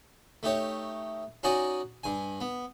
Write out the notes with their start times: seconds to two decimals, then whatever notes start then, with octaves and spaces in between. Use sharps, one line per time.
0.43 A3 D#4 G4 C#5
1.43 C#4 D#4 F#4 D5 G#5 A#5
2.04 G2 G#5
2.41 B3